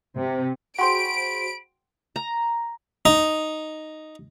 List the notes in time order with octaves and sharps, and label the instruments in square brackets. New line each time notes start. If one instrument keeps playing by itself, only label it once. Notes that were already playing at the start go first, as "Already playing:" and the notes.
[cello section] C3
[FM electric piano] F#4 G#4 C5 [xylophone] F#5 G5 C6 [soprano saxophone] B5 [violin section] D7
[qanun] A#5
[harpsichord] D#4